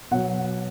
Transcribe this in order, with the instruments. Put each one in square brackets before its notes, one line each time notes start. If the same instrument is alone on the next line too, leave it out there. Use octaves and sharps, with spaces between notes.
[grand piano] B2 F#3 F#5